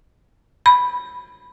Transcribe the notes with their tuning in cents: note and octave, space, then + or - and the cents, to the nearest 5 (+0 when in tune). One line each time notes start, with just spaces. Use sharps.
B5 -5